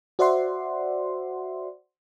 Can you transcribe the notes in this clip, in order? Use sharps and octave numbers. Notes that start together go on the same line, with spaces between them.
F#4 C5 D5 E5 F#5 C6